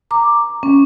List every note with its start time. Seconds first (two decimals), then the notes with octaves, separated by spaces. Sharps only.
0.11 A#5 D6
0.63 C#4